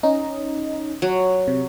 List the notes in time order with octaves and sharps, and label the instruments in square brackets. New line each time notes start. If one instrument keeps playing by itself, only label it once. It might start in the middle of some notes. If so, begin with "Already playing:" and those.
[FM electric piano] C#4 D#4 D#5
[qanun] F#3
[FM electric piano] C3